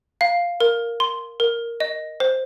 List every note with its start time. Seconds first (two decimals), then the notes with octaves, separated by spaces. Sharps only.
0.21 F5
0.60 A#4
1.00 C6
1.40 A#4
1.80 D#5
2.20 C5